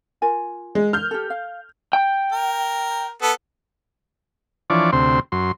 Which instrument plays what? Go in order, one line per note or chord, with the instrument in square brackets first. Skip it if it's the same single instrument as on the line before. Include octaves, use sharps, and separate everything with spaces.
[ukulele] F4 A#4 G#5
[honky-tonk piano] G#3
F6 G6
[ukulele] G4 A4
F5
[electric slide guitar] G5
[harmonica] A#4
B3 A4
[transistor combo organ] E3 F3 D4 C#5 D5
D2 C3 C4 C6
F#2 C6